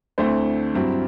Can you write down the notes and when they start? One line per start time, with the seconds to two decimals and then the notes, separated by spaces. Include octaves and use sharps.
0.18 D2 D3 A3 C4 E4 C5
0.74 G2 F#3 C4 E4